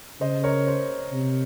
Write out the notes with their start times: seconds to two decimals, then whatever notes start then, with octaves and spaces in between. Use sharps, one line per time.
0.20 C#3 C5 D#5
0.43 A#4 C#5
0.67 C5
1.12 C3